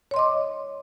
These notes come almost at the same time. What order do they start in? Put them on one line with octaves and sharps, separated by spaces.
C#5 C6 D#5 D6